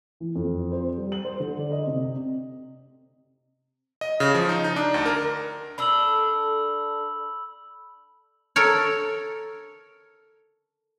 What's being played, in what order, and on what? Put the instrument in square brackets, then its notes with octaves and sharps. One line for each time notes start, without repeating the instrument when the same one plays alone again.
[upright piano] E3
F2
C5
G3
F#7
C5
D3
D5
D#5
C3
[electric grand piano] D#5
C#3
F3
D#4
D#4
D4
D2
A#4
[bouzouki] D4 A4 [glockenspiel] B5 E6 F#7
[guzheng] A4 A#4 C#5